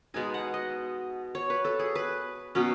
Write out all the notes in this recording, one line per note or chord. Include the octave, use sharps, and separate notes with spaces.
B2 G#3 B3 D#4 G#5
F#5
D#5
C#5
B4
A4
G#4
B4
B2 F#3 C#4